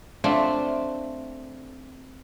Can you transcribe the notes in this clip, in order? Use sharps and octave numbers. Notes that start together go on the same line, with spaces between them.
A3 C4 D4 F4